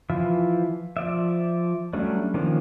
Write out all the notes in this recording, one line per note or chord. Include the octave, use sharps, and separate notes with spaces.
E3 F3 F4 E5
F3 D5 E5
F#3 G3 A3 C#4 D4
D#3 F3 A#3 C#4 D4